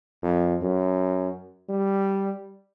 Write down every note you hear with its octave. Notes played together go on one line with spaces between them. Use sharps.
F2
F#2
G3